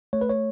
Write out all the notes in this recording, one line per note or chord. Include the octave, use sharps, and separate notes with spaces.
A3 C#5
B4
C#5